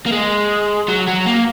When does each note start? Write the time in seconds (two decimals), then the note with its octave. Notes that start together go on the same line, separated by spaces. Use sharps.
0.06 A#3
0.12 G#3
0.88 F#3
1.07 F#3
1.26 A#3